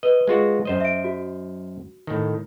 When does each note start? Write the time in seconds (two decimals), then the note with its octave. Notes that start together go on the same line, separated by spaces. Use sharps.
0.03 B4 D#5
0.27 G#3 F4 F#4
0.65 F#2 C5 D#5
0.80 E5 D7
1.04 F#4
2.07 A2 D#3